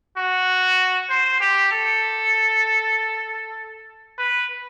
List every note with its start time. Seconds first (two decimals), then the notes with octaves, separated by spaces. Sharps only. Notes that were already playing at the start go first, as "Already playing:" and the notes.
0.17 F#4
1.10 C5
1.40 G4
1.72 A4
4.18 B4